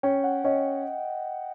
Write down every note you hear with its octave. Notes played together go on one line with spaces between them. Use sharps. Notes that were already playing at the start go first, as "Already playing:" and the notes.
C#4 G5
F#5
C#4 D#5